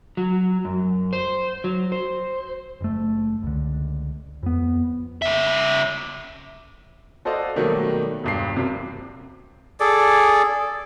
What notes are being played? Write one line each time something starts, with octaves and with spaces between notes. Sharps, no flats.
F#3
F#2
C5
F#3
C5
F#1 A3
C#2 D3
F2 B3
C#3 E5
F#4 A4 C5 D5 D#5 F5
B2 D#3 F#3 G3 A3 A#3
E1 G2 C7
F#2 C3
G#4 A4 D5